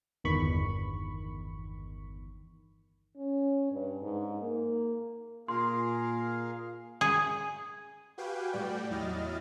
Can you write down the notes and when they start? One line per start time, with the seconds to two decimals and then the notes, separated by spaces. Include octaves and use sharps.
0.24 G1 E2 D#3 B5 C#6
3.17 C#4
3.72 G2
4.02 G#2
4.40 A#3
5.48 A#2 G#4 A#4 F5 C6
7.01 G#4
8.18 F#4 G4 B4 F5 G5 G#5
8.53 A2 G3 F#4 D5 G5
8.90 E2 F#3 E4 D#5 F6 A6